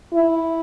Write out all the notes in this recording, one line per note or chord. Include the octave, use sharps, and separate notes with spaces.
E4